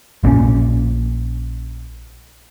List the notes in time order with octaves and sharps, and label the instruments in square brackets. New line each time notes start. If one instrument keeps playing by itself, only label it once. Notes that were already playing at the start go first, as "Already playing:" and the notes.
[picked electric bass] A#1 A#2 F3 C#4